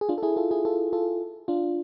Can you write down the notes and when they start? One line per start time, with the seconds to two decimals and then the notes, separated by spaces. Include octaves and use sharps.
0.01 G#4
0.09 D4 F4
0.18 A4
0.23 E4 G#4
0.36 F4 A4
0.51 E4 G#4
0.65 F4 A4
0.93 F4 A4
1.48 D4 F4